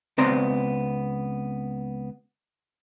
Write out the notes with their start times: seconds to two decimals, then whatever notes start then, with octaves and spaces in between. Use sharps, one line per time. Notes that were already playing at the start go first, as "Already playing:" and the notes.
0.18 C#2 B3 C4 D5 A#5 C6